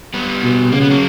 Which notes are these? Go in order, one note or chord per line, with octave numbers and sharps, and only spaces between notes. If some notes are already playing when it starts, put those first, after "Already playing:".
G3 B3
B2
C#3 A#3
B3
F#3 A#3